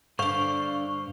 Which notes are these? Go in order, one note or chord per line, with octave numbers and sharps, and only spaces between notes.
G2 D3 D4 C5 F5 C#6